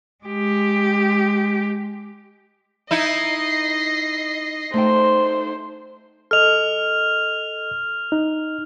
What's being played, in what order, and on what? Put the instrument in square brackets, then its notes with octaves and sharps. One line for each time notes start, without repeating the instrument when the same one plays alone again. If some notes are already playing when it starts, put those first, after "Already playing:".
[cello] G#3 G4
[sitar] D#4 E4 [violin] D#5 C7
[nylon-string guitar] A3 D#4 G5 [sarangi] C5
[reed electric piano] A4 D#5 [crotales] F6 F7
[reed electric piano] D#4